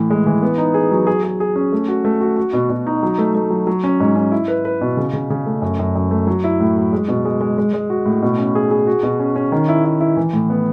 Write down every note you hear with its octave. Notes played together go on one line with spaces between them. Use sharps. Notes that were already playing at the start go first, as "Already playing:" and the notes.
Already playing: A2 E3
G#3
E3
B3
D#4
G#4
F#3
G#4
G#4
G#4
C#4
A3
F#4
A3
F#4
F#4
B2
B2
D#4
F#3
A3
A3
F#3
F#3
C#4
G#2
C#4
E4
B4
B4
B2
C#3
C#3
C#3
A3
F#2
F#2
F#2
A3
F#3
E4
A2
F#3
G#3
B2
G#3
G#3
G#3
G#3
F#4
A2
B2
C#4
G#4
G#4
F#4
B2
C#4
C#4
D#3
E4
E4
E4
E3
A2
B3